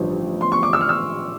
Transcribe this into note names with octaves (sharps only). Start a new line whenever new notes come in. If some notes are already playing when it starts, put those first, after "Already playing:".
Already playing: A1 G2 D3 F3
C6
C#6
D6
E6
F6
E6